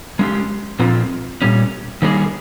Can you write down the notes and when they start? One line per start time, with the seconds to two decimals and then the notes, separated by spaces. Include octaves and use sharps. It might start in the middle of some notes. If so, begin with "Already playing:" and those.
0.19 G#3 C#4 G4
0.79 A#2 F3 C4 F4
1.42 A#2 G3 C#4
2.02 D#3 G3 A#3 C#4 G#4